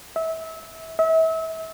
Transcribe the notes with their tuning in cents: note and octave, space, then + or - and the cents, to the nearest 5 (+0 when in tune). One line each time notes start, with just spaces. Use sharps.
E5 -25
E5 -35